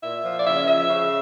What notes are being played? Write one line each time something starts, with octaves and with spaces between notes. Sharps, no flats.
A#2 E5
F3
D5
C#3 E5
F3 E5
C#3